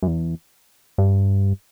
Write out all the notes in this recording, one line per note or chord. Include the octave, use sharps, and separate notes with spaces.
F#2
E2
G2